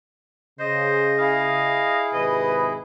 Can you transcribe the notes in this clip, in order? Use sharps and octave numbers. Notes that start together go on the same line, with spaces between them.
C#3 C5 D#5
E4 G#4 F5
G#1 C3 B4 D#5